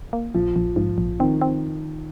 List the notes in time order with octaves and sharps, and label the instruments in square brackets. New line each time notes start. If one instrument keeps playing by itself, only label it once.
[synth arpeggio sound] A#3
[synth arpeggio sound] A#1 [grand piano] F3
[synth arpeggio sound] A#1
[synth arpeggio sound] G#2 [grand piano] F3
[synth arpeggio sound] A#1
[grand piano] D#3 [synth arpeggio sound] C4
[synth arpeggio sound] C4